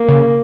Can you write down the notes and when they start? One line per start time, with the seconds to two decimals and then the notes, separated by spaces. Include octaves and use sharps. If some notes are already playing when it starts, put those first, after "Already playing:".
Already playing: A#3
0.09 C#3